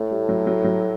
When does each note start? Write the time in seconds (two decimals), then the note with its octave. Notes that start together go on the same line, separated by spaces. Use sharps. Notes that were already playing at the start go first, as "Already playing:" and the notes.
Already playing: A2 A3
0.11 G3
0.29 F#3
0.47 F#3
0.65 F#3